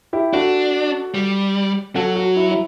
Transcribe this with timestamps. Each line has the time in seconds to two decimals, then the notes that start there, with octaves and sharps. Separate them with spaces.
0.13 E4 G4
0.33 D4 F#4 A4
1.14 G3
1.95 F#3 F#4 A4
2.16 F#4
2.36 E4
2.51 E4